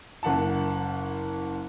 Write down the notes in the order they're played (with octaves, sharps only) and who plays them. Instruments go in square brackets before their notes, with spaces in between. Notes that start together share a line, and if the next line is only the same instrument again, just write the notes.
[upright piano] F#1 F#5 A5